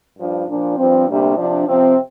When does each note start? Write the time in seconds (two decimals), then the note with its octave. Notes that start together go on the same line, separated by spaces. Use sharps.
0.16 G2 F3 D4
0.47 A#2 F3 D4
0.77 G2 F3 C4
1.06 D2 C3 G3 A#3 D4
1.36 C3 F3 D4
1.66 C3 F3 C4